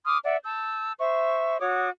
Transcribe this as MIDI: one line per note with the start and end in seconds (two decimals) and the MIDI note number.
0.05 0.17 84
0.05 0.17 86
0.05 0.17 87
0.05 0.17 89
0.24 0.36 74
0.24 0.36 76
0.24 0.36 78
0.44 0.92 81
0.44 0.92 88
0.44 0.92 91
0.99 1.59 72
0.99 1.59 76
0.99 1.59 85
1.61 1.88 66
1.61 1.88 73
1.61 1.88 86
1.61 1.88 87